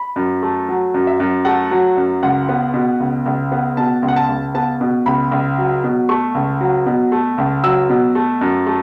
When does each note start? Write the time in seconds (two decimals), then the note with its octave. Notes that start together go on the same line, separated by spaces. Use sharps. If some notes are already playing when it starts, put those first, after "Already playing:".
Already playing: B5
0.16 F#2
0.43 A3
0.69 F#3
0.94 F#2
1.07 E5
1.20 F#2
1.45 A3 F#5
1.71 F#3
1.97 F#2
2.23 C#2 F#5
2.49 B3
2.74 B2
3.00 C#2
3.26 C#2
3.52 B3
3.77 B2 A5
4.02 C#2
4.08 F#5
4.16 A5
4.29 C#2
4.55 B3 A5
4.81 B2
5.06 C#2 B5
5.32 C#2
5.58 F#3
5.84 B2
6.09 A3 C#6
6.35 C#2
6.61 F#3
6.86 B2
7.12 A3
7.38 C#2
7.64 F#3 E6
7.90 B2
8.15 A3
8.41 F#2
8.67 A3